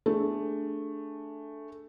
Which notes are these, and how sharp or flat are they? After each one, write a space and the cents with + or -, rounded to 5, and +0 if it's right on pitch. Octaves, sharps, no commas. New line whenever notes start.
A3 +0 D4 +0 G#4 +0